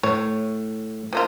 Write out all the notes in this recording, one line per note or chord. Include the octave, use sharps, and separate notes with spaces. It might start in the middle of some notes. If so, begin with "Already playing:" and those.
A2 C#5
F3 A#3 F4